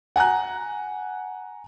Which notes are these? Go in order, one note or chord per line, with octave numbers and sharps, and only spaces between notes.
F#5 G#5 A#5 F#6